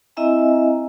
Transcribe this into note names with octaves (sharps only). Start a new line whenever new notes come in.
C4 E4 D#5 E5 G#5 A#5